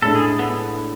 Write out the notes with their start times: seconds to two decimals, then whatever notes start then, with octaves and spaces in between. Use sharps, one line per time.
0.02 A2 G#3 D4 A4
0.15 G#4
0.39 B3